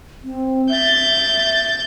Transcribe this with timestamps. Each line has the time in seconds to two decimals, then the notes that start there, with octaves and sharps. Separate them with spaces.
0.24 C4
0.69 E5 G6 A6